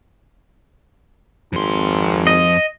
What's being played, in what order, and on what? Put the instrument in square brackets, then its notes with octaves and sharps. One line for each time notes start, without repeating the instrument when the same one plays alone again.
[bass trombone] G#1 [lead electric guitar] F2 C6
[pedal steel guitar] D#5